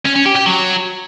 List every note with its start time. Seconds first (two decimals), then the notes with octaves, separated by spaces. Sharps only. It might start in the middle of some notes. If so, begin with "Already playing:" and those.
0.05 C#4
0.15 C#4
0.25 G4
0.36 G4
0.46 F#3